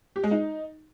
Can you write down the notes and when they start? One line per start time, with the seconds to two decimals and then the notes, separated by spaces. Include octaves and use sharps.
0.16 G4
0.23 G#3
0.31 D#4